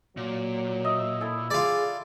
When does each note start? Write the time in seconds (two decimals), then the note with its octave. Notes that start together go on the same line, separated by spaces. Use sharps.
0.17 A#2 F#3
0.84 D#5 E5
1.21 E4 A4
1.51 F4 G#4 D5